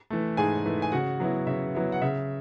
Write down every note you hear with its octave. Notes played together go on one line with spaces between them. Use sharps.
E3 A3
G#2 G#4 G#5
E3 A3
G#5
C#3 F#4 F#5
F#3 B3 E4
C#3 E5
F#3 B3 E4
F#5
C#3 E5